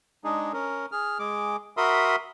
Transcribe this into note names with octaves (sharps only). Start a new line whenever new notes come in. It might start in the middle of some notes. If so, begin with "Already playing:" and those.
G#3 D4 D#4 G#4
C#4 A#4
G#4 F6
G#3 G#4 D6
F#4 A#4 E5 B5 C6 D#6